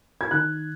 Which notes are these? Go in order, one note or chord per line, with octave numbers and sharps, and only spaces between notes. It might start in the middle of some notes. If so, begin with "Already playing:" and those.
G#6
D#3 F#6